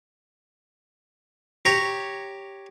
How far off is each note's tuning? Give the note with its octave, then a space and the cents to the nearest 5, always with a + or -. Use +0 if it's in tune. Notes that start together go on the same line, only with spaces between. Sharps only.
G4 +0 C#5 +0 A#5 +0